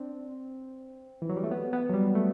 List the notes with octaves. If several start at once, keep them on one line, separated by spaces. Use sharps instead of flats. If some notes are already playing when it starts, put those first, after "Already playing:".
Already playing: C4 D4
E3
F#3
G3
A3
B3
B3
F#3
G3
A3